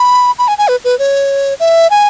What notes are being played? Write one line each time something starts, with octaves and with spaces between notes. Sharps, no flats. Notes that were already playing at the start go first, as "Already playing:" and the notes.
Already playing: B5
B5
G#5
G#5
B4
B4
C#5
E5
G#5